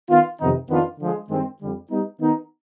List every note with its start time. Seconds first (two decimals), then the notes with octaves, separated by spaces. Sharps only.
0.09 D#3 B3 F4
0.39 F2 C3 D#3 B3 D#4
0.69 F2 D#3 B3 D4 F4
1.00 D3 F3 G#3
1.29 G2 D#3 G#3 C4
1.60 F2 D3 G3
1.90 G3 B3 D#4
2.20 D#3 B3 D#4